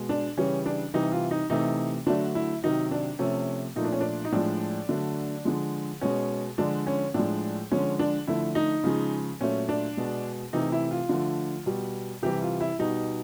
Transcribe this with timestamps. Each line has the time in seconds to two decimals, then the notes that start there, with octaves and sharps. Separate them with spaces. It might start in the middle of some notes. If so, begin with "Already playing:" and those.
Already playing: B2 G#3
0.09 D4
0.37 C#3 E3 G3 C#4
0.66 D4
0.94 C3 E3 G3 D#4
1.12 F4
1.31 D#4
1.50 C3 E3 A3 D#4
2.07 D3 F#3 A3 D4
2.35 E4
2.63 C3 D#3 F#3 D#4
2.91 D4
3.19 C3 F3 A3 C#4
3.76 A#2 F3 A3 D#4
3.85 D4
3.92 C#4
4.01 D4
4.25 D#4
4.32 A2 F3 G#3 D4
4.89 D3 F#3 A3
5.45 D3 F3 G#3
6.01 B2 G#3 C#4
6.58 D3 F3 G#3 D4
6.87 C#4
7.14 A2 F3 G#3 D4
7.72 D3 F3 G#3 C#4
7.99 D4
8.27 D3 F3 A3 E4
8.55 D#4
8.84 C#3 F3 G#3
9.40 A#2 F#3 A3 C#4
9.69 D4
9.97 B2 G#3
10.53 C3 E3 A3 D#4
10.72 E4
10.91 F4
11.09 D3 F3 A3
11.66 B2 G3
12.23 C3 E3 G3 G4
12.42 F4
12.61 E4
12.79 B2 G3 D#4